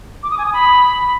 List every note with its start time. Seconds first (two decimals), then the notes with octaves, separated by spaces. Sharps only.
0.23 D6
0.31 D#6
0.38 G#5
0.46 D#6
0.53 B5